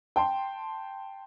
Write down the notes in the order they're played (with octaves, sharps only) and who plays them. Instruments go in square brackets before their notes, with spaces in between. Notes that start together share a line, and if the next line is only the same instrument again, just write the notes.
[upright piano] G5 A5 C6